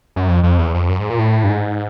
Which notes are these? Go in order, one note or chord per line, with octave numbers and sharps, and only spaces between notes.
F#2
F2
F2
E2
F2
F#2
G#2
A#2
A2
G2
G#2